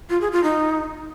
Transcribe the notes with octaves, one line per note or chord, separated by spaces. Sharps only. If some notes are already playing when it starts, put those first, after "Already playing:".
F4
G#4
F4
D#4